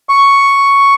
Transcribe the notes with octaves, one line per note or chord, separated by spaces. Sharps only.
C#6